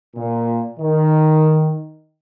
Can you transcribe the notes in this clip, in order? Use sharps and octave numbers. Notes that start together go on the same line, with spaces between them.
A#2
D#3